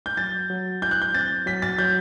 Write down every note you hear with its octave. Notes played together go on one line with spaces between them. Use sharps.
G6
F#3 A6
F#3
E4 G6
F#6
G6
C4 A6
F#3 B6
A6
F#3 G6